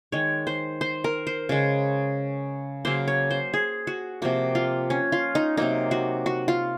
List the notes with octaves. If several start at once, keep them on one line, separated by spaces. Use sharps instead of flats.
D#3 G#3 C#5
C5
C5
A#4
C5
C#3 G#3
C#3 F#3 A#3 C5
C#5
C5
G#4
F#4
C3 F3 A#3 F#4
F4
C#4
F4
D#4
C3 F#3 A#3 D#4
F#4
F#4
F4